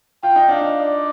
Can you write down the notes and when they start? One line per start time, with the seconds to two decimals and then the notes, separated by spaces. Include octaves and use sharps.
0.23 F4 G5
0.36 D#4
0.49 D4 F5
0.61 D#4
0.80 D5